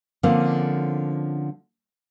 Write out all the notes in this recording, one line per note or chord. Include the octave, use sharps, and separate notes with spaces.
D3 F3 A#3 C4 C#4